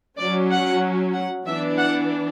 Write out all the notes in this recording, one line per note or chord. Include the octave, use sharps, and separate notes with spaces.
F#3 C#4 D5
F#5
F#5
E3 B3 D4 E5
F#5